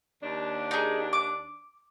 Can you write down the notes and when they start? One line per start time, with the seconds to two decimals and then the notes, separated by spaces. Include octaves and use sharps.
0.22 D#2 D4
0.71 D#4 G#4
1.13 D6